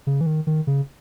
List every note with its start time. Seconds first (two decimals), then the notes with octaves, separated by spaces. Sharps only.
0.07 C#3
0.21 E3
0.26 D#3
0.47 D#3
0.67 C#3